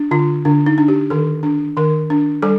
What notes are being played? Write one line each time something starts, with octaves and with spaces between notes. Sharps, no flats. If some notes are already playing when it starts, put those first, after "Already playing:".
Already playing: D4
D3 F4
D3 D4
D#4
D4
G4
D#3 A4
D4
D#3 A#4
D4
G3 A4